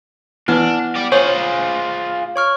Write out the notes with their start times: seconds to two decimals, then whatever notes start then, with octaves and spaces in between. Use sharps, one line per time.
0.48 E3 B3 D4 F6
0.96 G4 D5
1.12 F4 G#4 C5 C#5
2.36 C#5 C#6 F6